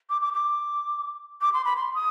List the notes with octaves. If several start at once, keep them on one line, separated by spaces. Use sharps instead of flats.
D6
D6
D6
D6
C6
B5
C6
D#6